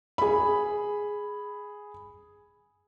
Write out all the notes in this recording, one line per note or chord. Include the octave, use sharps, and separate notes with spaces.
G#4 B5